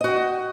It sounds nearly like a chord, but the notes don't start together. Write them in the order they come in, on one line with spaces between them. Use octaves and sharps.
D#5 F#4 G5